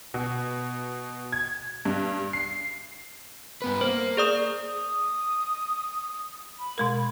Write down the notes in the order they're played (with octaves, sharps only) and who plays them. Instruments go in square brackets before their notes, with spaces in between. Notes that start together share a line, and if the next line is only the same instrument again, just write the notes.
[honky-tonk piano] B2
G#6
G2
C7
[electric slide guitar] G2 B3 B4
[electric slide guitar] A#3 [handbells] C5
[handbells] G#4 D5 D#6
[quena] D#6
B5
[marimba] B2 G#3 A#4